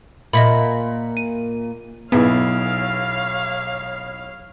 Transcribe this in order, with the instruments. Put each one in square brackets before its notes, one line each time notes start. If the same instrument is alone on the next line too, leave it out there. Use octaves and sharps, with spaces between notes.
[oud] A#2 [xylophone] D#5 E5 B5
[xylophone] D#7
[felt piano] B1 E4 G#4 [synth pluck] B3 [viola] C#5 F5